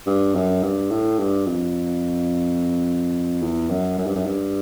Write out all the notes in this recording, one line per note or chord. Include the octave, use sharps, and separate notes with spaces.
G2
F#2
G2
A2
G2
F2
E2
F#2
F#2
G2
F#2
G2